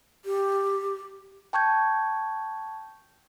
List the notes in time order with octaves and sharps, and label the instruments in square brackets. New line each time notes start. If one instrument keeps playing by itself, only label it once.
[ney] G4
[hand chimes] G5 A5 C#6 G6 G#6